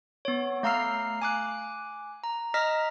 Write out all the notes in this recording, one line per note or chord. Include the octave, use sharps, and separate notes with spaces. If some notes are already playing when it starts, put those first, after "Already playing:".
B3 C#5
A3 F5 A#5 E6 F6 C7
G#5 D6 F#6
A#5
D#5 A#5 F6 A#6 B6